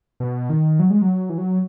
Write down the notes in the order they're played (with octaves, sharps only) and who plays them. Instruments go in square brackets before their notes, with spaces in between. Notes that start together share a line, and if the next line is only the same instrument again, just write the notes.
[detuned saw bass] B2
D#3
F#3
G#3
F#3
E3
F#3